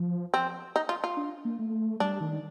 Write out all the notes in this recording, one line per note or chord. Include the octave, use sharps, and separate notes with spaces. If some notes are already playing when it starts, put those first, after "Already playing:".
Already playing: F3
C4
D#4
F4
F4
D4
A#3
A3
G3 D4
D#3